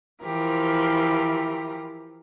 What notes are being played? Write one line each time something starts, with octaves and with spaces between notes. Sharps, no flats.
E3 F3 G4 A#4